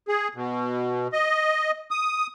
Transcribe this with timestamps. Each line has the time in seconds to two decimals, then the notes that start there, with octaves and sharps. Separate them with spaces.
0.08 G#4
0.35 B2
1.13 D#5
1.91 D#6